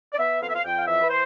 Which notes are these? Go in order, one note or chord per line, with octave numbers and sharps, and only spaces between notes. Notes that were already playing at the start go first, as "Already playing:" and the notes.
D5
B3 E5
F2 F5
E5
F5
F2 G5
F5
E3 E5
B4
C5